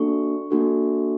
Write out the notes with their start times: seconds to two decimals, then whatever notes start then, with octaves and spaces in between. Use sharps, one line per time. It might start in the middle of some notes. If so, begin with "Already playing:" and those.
Already playing: A#3 D4 F#4 A4 C#6
0.51 A#3 D4 F#4 A4